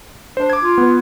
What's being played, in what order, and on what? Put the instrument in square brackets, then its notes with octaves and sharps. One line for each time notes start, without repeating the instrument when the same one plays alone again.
[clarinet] D4 [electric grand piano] C5
[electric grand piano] D6 G#6
[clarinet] F4
[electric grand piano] B3